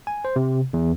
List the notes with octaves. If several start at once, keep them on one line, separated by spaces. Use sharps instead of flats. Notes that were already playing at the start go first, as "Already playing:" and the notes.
G#5
C5
C3
E2